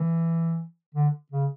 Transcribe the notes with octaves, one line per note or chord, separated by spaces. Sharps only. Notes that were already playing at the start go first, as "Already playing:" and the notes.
Already playing: E3
D3
C#3